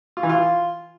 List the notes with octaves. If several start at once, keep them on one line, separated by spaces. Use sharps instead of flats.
F4
E3
F4